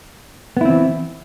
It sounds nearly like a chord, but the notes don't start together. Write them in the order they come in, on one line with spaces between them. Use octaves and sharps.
B3 E4 C4 E3